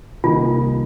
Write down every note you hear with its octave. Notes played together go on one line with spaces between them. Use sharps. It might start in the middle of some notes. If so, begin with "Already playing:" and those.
C2 C3 D#3 A#3 D#4 F4